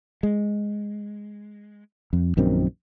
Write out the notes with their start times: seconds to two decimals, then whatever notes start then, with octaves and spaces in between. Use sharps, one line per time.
0.23 G#3
2.13 F2
2.37 A#1 F#2 D#3 C4